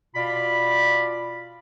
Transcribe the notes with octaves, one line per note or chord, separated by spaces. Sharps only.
B2 F4 D5 B5